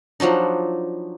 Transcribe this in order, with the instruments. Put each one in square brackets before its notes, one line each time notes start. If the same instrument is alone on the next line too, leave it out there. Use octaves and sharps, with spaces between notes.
[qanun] F3 F#3 D4 D#4